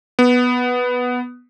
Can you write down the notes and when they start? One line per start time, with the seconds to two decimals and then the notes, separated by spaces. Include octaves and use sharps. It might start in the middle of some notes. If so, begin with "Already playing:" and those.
0.19 B3